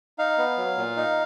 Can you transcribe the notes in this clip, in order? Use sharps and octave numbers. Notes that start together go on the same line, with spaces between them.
D#4 F5
B3
F#3
A#2
D#4